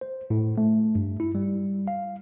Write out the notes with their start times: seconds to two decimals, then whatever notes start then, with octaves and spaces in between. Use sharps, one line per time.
0.01 C5
0.30 A2
0.58 A3
0.95 G2
1.20 E4
1.35 G3
1.88 F5